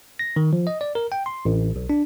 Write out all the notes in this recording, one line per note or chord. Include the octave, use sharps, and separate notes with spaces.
A#6
D#3
F3
D#5
D5
A#4
G5
C6
A1
B1
D4